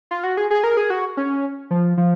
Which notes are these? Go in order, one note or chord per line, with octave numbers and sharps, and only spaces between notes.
F4
F#4
G#4
G#4
A#4
G#4
F#4
C#4
F3
F3